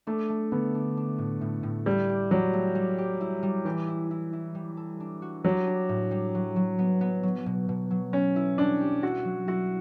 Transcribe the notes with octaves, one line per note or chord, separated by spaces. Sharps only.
A3 D4
A3
D3 B3
D4
D4
A2
A2
A2
G3 A3
G4
F#3 G4
A3
G3
G4
E4
G3
E3 G4
E4
E4
E4
G3
A4
D4
F#4
F#3 G4
D4
A2
G3
F#3
F#3
B3
B3
F#3
B2
B2
F#3
B3 C#4
E4
G3 D4
G4
E4 F#4
F#3
E4 F#4